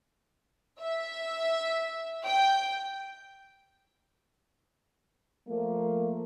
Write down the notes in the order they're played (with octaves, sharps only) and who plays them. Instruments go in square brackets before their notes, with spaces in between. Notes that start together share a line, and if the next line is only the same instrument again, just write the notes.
[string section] E5
G5
[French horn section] F3 A3 A#3